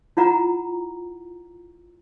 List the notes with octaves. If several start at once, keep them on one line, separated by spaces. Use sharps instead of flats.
E4 F4 F#5 A#5